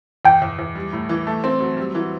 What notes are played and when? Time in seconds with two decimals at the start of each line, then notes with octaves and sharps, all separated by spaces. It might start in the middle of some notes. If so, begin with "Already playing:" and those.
0.25 E2 G5
0.42 E2
0.59 E2
0.75 G3
0.93 A2
1.09 E3
1.27 A3
1.44 C4
1.60 F#3
1.77 G3
1.95 E3